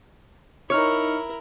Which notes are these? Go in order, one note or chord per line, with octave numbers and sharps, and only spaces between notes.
D#4 E4 A#4 C#5 F6 C#7